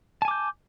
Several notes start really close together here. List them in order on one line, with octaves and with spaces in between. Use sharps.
A5 G#5 D6 G6